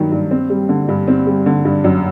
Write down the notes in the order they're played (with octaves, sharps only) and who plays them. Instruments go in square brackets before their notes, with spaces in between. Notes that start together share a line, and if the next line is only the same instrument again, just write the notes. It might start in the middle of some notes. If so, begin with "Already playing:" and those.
Already playing: [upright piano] G2 D#3 F#3
G2
C4
G3
D3
G2
C4
G3
D3
G2
F#2